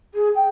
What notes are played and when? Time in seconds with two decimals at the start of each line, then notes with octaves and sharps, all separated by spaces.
0.14 G#4
0.35 G5